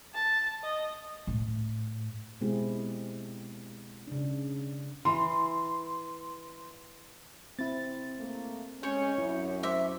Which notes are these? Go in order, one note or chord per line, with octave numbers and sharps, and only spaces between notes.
A5
D#5
A2
B2 G#3 C4 E4 G4 G#4
C#3 D4
E3 C6
C4 E4 A6
A3 A#3
G#3 C#4 C#5 G6 C#7
F#2 E4
C5 E5 D6